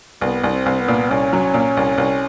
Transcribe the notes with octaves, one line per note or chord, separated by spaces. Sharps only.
C2 B3
C2
C4
C2
B3
A#2
C2 C#4
F#3
A#2
C2
C2